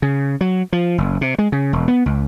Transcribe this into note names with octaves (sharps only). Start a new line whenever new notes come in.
C#3
F#3
F3
F#1
C3
G#3
C#3
E1
B3
C#2